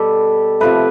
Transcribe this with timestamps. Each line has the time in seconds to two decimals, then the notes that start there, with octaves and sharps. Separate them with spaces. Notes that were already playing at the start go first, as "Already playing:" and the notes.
Already playing: B2 G3 G4 A4
0.60 C3 F3 A3 B4